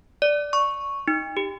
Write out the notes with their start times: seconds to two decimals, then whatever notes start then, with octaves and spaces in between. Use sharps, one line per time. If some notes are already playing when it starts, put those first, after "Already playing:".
0.22 D5
0.53 C#6
1.08 D#4
1.37 G4